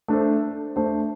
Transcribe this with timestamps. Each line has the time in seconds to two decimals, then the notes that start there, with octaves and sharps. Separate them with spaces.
0.08 A3 D4 A4 C5
0.76 A3 D4 A4 C5